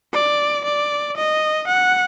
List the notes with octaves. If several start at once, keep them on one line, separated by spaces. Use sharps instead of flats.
D5
D5
D#5
F#5